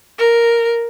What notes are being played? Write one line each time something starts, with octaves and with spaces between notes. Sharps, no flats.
A#4